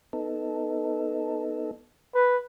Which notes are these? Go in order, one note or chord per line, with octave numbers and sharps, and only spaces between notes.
B3 D#4 A4
B4